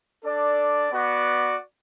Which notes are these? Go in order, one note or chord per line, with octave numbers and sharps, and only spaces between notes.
D4 A4 D5
B3 F#4 D5